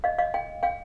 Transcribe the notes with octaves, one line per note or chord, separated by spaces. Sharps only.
D#5 F5
D#5 F5
F5 G5
F5 G5